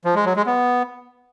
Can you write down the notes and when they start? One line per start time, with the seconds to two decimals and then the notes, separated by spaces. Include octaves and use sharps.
0.05 F3
0.15 G#3
0.26 F#3
0.36 G#3
0.46 B3